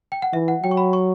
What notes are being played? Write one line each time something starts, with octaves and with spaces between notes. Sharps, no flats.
G5
F#5
E3 E5
F#5
F#3 G5
C#6
B5
C#6